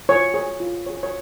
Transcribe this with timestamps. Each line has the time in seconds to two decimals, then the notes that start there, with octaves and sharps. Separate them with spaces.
0.09 F4 C#5
0.34 G#4 C#5
0.60 F4
0.86 G#4 C#5
1.03 C#5